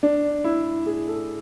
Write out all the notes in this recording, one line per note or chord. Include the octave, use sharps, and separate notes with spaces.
D4
E4
G#4
A4